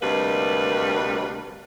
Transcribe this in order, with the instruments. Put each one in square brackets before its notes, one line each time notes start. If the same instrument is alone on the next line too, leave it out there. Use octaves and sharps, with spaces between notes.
[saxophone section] D2 C3 D#3 G3 A#3 B4